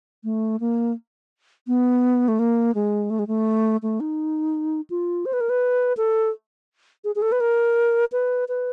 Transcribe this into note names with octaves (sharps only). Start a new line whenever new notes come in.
A3
A#3
B3
A3
A#3
G#3
A3
G#3
A3
A3
D#4
F4
C5
B4
A#4
B4
A4
G#4
G#4
A4
B4
A#4
B4
B4